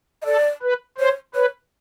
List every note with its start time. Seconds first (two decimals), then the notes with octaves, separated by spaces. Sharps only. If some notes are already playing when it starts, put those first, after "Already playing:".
0.22 D#5
0.25 A4 D5
0.62 B4
0.98 C5 C#5
1.35 B4 C#5